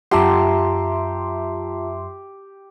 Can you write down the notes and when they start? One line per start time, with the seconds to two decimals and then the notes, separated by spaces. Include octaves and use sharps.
0.11 F#2 F4 G4 E5 A5 A#5 C6